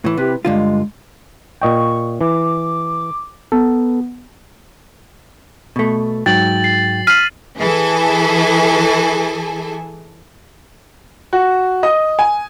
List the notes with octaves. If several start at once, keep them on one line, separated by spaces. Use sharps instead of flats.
A2 E3
C3 E4 G4 B4
G2 D3 G#3 F4
A#2 D#5 G5 C#6
E3 D6
B3 A4
B2 A3
G#2 F#3 G5 A6 F#7
C7
F6 B6 C7 D#7 F#7
E3 G#4 A4 G#5
F#4
D#5 D#6
G#5